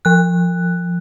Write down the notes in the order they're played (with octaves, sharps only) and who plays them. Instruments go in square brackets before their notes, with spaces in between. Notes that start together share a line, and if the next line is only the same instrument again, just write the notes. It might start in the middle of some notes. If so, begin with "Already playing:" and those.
[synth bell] F3 F#6